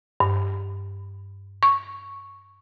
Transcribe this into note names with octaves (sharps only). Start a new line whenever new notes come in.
G2
C#6